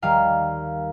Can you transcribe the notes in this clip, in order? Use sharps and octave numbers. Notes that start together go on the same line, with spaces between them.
D#2 D#3 G3 F5